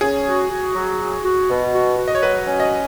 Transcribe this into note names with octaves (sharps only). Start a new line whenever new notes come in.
C#4 G#4
F#4
F#4
F#3
F#4
F#4
B2
F#4
F#4
D#5
C#5
F#3 B4
C#4
D#5